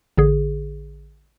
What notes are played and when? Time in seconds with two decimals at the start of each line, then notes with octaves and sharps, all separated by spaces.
0.17 A1 D3 G#4